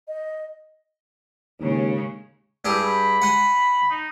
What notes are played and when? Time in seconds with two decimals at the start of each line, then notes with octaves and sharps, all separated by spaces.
0.08 D#5
1.60 D#2 C#3 G#3
2.65 G2 E4 G4 G#4
2.84 B5
3.22 F#5 G#5 C6
3.91 D#4